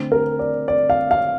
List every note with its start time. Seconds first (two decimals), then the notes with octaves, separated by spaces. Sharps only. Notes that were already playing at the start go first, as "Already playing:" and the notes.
Already playing: D3 A3 C4
0.12 A#4
0.39 D5
0.68 D5
0.90 F5
1.11 F5